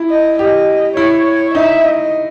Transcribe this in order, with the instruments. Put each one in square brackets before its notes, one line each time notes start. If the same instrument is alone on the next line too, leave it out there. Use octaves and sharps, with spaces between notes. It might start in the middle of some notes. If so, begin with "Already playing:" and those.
Already playing: [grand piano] E4
[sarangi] D#5
[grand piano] G4 [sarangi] D#5
[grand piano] E4 [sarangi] C#5
[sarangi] C#5
[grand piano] D#4 [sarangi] E5
[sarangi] D#5